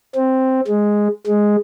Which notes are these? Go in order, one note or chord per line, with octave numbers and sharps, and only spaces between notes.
C4
G#3
G#3